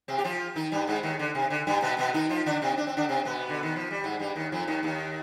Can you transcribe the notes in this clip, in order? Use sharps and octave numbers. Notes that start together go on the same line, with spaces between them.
C3 C4
G4
F3 F4
D#3 D#4
G2 G3
G#2 G#3
D#2 D#3
D3
C3
D3
G2 G3
B2 B3
B2 B3
D#3 D#4
F3 F4
D3 D4
C3 C4
D4
C4
D3 D4
C3 C4
B2 B3
D3
D#3
F3
G3
G#2 G#3
G2 G3
D#2 D#3
F2 F3
D#2 D#3
D#2 D#3